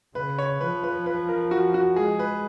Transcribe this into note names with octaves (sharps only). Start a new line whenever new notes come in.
C#3 B4
C#5
F3 B4
B4
B4
A#4
F#4
F#4
G#3 G#4
B4